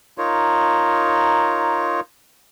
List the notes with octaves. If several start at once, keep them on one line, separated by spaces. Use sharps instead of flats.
D#4 F4 A#4 C#5